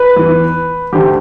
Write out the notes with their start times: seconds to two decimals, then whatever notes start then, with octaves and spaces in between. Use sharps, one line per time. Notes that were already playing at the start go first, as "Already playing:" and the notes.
Already playing: B4
0.16 E2 E3
0.92 D2 D3 G4